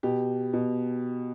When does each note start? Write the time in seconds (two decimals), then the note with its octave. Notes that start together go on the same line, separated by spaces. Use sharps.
0.03 B2 G4
0.53 B2